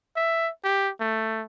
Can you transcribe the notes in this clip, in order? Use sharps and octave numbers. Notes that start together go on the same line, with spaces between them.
E5
G4
A3